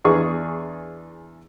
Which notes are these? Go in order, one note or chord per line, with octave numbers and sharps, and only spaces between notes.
E2 D4 G#4 C#6